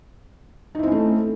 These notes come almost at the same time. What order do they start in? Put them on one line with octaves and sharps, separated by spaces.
D#4 E4 C4 C#4 A3